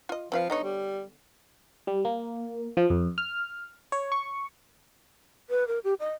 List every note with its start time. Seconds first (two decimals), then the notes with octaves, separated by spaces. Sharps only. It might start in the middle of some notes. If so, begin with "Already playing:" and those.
0.09 F4 D#5
0.32 F3 C4 B4 F5
0.50 D3 B3 D#4 C#5
0.64 G3
1.87 G3
2.05 A#3
2.77 F3
2.90 F2
3.18 F6
3.92 C#5
4.12 C#6
5.50 B4
5.67 A#4
5.84 G4
6.00 D#5